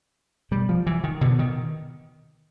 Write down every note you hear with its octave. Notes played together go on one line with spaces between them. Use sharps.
B2 G3
F3
E3
D#3
B2 D3
D#3